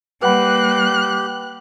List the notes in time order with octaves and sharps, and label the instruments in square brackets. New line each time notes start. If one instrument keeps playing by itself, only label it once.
[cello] G3 A#3 [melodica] G4 [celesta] B4 F#5 B5 [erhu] F#6